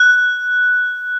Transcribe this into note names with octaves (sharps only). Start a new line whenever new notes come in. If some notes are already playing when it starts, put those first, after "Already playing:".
Already playing: F#6